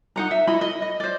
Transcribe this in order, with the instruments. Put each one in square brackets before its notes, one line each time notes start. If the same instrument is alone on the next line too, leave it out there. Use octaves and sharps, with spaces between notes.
[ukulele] D#4 F#5 A#5
E5
E4 D#5 B5
D#5
D#5
C5 D5